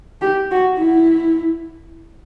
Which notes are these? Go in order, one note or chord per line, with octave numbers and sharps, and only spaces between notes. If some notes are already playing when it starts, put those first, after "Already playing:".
G4
F#4
E4